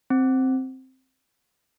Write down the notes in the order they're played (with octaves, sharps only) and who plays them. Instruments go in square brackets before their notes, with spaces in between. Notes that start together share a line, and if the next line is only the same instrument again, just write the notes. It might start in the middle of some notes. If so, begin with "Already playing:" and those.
[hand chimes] C4